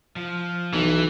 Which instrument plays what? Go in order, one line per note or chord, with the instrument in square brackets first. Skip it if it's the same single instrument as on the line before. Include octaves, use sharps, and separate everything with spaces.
[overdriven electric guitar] F3
[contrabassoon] B1 [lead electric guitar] E3